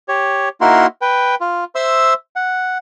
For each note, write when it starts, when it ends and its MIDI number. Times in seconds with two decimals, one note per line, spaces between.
0.09 0.49 67
0.09 0.49 73
0.61 0.86 58
0.61 0.86 63
0.61 0.86 64
0.61 0.86 66
0.61 0.86 70
0.61 0.86 84
1.02 1.35 71
1.02 1.35 79
1.41 1.64 65
1.75 2.14 72
1.75 2.14 76
1.75 2.14 84
1.75 2.14 88
2.36 2.78 78